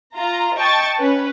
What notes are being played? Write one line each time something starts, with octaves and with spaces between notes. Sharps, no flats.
F4 A#5
D#5 G5 A5 C#6 A6
C#4 B4